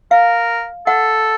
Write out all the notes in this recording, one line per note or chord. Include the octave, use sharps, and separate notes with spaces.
A#4 F5
A4 F#5